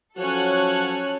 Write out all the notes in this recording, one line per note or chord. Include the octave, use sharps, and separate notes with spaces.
F3 F#3 C#4 F#4 A4 C#5 F#6